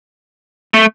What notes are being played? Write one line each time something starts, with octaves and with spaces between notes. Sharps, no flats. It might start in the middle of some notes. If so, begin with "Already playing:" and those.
A3